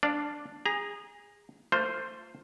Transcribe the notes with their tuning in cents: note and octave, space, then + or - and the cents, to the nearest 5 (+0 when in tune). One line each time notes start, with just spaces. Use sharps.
D4 +0 D5 +0 F5 +0
G#4 -20 A#5 +15
A3 +45 F4 +10 C5 +0